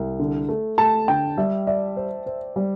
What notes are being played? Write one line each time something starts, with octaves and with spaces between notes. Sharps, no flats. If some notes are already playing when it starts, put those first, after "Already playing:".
Already playing: C2
D3
A3
A3 A5
D3 G5
G3 E5
D5 E5
C5
C5
G3